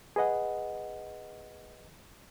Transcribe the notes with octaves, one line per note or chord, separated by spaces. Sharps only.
G#4 B4 D#5 F#5